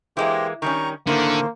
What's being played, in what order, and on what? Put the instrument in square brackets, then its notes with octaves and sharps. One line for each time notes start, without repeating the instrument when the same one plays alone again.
[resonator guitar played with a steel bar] E3 G#3 A#3 [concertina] G4 C5
[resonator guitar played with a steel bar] D#3 G3 C#4 [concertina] A#5 C#6
[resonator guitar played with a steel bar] A2 D#3 [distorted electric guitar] D3 [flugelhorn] A#3 [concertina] C5